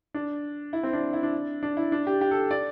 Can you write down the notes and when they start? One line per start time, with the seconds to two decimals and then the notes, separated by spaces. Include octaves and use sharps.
0.14 D4
0.73 E4
0.83 C4
0.93 D4
1.13 E4
1.23 D4
1.63 D4
1.77 E4
1.92 D4
2.07 G4
2.21 G4
2.31 A4
2.51 D5